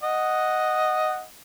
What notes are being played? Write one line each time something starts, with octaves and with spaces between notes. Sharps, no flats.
D#5 F#5